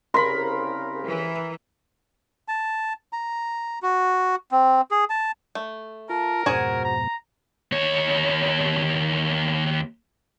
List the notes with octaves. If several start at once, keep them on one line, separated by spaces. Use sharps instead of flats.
C2 C#3 A#4 B5 C6
E3
A5
A#5
F#4
C4
G#4
A5
A3
F4 A#4 A5
F2 G#2 B2 F#4 G#4 C5 G#5
A#5
D#2 C#5